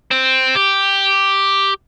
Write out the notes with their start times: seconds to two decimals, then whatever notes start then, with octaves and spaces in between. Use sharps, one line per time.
0.11 C4
0.55 G4